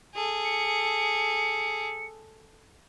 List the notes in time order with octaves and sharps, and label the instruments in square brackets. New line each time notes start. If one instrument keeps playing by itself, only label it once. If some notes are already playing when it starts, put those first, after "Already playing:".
[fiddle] G#4 A4
[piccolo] C#7